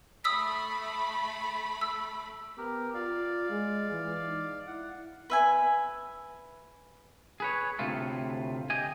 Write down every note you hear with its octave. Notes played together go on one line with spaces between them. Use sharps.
A3 B5 D#6 E6 B6
E6
B3 G4 A#4
F4 D5 F5
G#3
E3
D#4
E4 F#5
B4 E5 G#5
G#4 B4 C#5
D2 A2 C3 F4 A4
G4 D#5 G#5